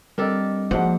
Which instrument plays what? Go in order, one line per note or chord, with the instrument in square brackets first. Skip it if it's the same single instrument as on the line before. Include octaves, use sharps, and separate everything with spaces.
[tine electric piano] G3 C4 D#5 [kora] D4 G4 A4 [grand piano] A#4
[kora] G#2 F#5 [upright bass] F3 A#3 [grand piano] D4 F#4 C5